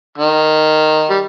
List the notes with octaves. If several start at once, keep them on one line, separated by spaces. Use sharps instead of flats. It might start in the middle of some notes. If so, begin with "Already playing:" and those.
D#3
G3